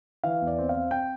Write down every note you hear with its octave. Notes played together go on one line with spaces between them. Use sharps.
E3 F5
E2
D5
C4
C4 F5
C4 G5